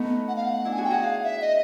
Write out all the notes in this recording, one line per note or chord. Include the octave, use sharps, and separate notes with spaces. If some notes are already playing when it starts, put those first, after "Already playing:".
Already playing: A3 B3 D#4
F#5
F5
F#5
D4 E4
G#5
F#4 G#4
G5
F#4 G#4 F#5
F5
E5
D#5